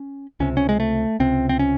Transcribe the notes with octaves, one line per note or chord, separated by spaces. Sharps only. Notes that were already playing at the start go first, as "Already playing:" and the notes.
Already playing: C#4
C#2 C3 C#4
C#4
G#3
A3
C#2 C3 C4
C4
C#4